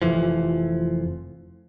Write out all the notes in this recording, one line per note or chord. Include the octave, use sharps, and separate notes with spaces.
F1 F2 E3 F3